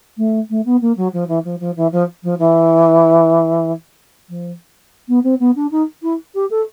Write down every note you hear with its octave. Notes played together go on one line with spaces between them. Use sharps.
A3
A3
B3
A#3
F#3
F3
E3
F3
F3
E3
F3
F3
E3
F3
B3
C4
B3
D4
D#4
E4
G4
A4